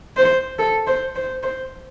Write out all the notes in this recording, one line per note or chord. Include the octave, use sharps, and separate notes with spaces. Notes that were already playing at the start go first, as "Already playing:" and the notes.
C5
A4
C5
C5
C5